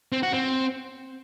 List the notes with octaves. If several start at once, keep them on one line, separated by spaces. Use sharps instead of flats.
C4
F#4
C4